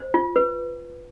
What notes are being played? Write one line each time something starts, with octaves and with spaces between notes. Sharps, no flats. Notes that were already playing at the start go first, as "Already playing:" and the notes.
Already playing: C5
F4
B4